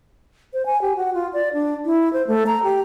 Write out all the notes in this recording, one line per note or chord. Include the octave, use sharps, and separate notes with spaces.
C5
G#5
G4
F#4
F4
D5
D4
E4
C5
A3
A#5
G4